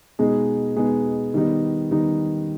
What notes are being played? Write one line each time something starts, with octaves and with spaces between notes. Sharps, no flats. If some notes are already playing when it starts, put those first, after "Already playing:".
B2 G#3 B3 D#4 G#4
B2 G#3 B3 D#4 G#4
D#3 G3 B3 D#4
D#3 G3 B3 D#4